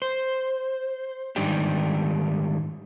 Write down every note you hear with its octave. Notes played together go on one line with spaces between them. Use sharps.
C5
G#2 D#3 G3 D4 G4